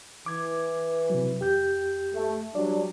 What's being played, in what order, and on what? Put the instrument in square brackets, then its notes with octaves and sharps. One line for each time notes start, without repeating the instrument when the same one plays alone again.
[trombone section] E3 [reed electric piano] D6 G#6
[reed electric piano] C3 F#3
F2 G4 G6
[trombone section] A3
[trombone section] F#3 G3 D4 [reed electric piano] D5